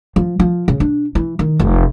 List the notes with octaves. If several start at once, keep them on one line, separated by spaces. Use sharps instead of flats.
F3
F3
C#3
D4
E3
D#3
F1